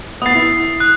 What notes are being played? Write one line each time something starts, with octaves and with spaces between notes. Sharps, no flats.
B3 D#6 A6 C7
E4
F#6